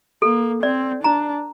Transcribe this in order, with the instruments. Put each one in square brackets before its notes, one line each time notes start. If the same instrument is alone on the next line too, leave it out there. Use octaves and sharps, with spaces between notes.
[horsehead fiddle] A#3 [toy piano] A4
[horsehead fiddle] C4 [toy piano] D5
[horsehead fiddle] D4 [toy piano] A#5